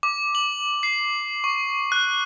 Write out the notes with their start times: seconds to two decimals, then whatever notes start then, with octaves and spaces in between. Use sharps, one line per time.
0.03 D6
0.35 F#7
0.83 C7
1.44 C#6
1.92 F#6